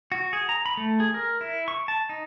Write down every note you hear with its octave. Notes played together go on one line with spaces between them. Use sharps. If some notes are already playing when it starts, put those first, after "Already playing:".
F#4
G#4
A#5
B5
A3
G#4
A#4
E4
C#6
A5
D#4